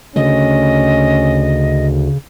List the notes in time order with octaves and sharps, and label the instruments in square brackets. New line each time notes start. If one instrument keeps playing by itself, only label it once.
[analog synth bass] D2 [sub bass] C#3 [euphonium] C#4 [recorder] D#5